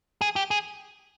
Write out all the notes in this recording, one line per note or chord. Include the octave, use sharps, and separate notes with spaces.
G#4
G4
G#4